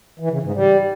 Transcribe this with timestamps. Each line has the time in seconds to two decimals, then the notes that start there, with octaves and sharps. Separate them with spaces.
0.20 E3
0.31 C#3
0.43 G#2
0.54 G3